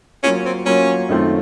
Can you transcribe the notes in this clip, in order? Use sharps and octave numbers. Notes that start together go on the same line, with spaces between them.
F#3 A#3 C#4 F4
C4
F#3 A#3 C#4 F4
F#2 D#3 A3 C4 F4